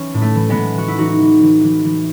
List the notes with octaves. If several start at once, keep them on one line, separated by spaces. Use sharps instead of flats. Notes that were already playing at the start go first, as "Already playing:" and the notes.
Already playing: E3 C#4
A2
A3
E3
G#3 B3
A2
E3 F#4
E4
E3 D#4 F#4
E3
E3
E3
E3